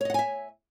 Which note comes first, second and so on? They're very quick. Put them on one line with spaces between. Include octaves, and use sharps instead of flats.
C#5 D#5 F#5 G#5 E5